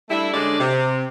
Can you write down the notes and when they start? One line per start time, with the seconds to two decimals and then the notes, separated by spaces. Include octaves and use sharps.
0.10 G3 A3 D4 E4
0.34 D3 G#3 C#4 D4 G4 D5
0.60 C3